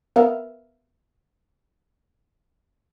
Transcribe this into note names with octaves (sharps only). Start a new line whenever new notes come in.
B3 A#4 E5 F5